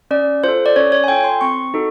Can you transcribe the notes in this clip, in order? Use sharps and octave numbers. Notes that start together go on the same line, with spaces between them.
C#4 D5
F4 A4 C5
D5
C#4 C#5
C#5
G#5
F4 A4 G5
C6
C4 C#6
D#4 F#4 A4